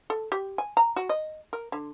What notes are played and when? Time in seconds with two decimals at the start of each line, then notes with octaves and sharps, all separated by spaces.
0.10 A4
0.32 G4
0.58 G#5
0.77 A#5
0.96 F#4
1.09 D#5
1.53 A#4
1.72 D3